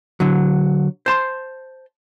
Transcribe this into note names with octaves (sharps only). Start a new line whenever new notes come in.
D3 F#3
C5 A5 C6